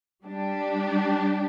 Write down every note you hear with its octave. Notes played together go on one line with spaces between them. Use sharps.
G3 D4 G4